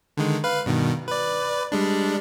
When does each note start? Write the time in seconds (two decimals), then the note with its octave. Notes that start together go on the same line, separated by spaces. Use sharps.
0.17 D3 D#3 G#3
0.44 B4 F5
0.66 G2 B2 D#3
1.08 B4 D5
1.72 G3 G#3 D4